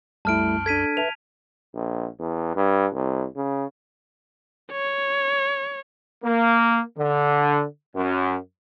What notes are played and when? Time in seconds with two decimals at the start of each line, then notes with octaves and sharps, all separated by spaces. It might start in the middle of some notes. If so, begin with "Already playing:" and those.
0.25 C2 F#2 G3 A3 E4 A5 F6 D7
0.66 D4 A4 G#6 B6 D#7
0.97 B4 E5 A5 F7
1.75 A#1
2.19 E2
2.56 G2
2.93 C2
3.36 C#3
4.72 C#5
6.24 A#3
6.97 D3
7.95 F#2